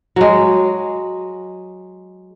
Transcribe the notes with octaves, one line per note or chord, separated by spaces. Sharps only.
F#3 G#3